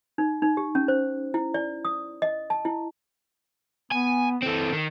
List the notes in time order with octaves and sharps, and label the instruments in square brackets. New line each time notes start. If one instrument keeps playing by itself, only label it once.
[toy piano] D#4
D#4
G4
C#4
C5
E4
D5
D#6
D#5
A5
E4
[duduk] B3 [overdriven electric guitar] G#5
[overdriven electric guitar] E3 C4 [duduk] A4
[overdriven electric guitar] D#3